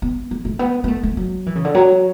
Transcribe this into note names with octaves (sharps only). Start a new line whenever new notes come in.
B3
A3
A3
B3
B3
A3
A3
F#3
E3
C#3
D3
F#3